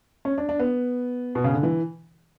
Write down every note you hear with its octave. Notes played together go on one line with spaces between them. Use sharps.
C#4
D4
D4
B3
B2
C#3
D3
E3